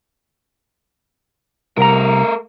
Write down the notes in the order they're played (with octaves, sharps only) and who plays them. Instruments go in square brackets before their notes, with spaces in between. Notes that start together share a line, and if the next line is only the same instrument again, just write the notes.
[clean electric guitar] C2 A#5 [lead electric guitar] A3 A#4